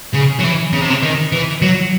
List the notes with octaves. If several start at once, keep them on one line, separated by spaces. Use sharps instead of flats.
C#3
F#3
E3
C#3
C3
C#3
D#3
E3
F#3